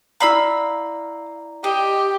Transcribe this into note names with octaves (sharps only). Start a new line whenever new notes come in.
E4 D5 F5 A#5 B5 E6
G4 D#5